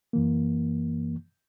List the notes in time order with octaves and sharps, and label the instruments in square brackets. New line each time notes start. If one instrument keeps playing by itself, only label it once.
[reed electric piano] F#2 E3 A#3